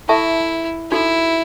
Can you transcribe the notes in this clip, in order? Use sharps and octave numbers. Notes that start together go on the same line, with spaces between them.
E4 A4 E5 A5 C#6
D#4 E4 F#4 A4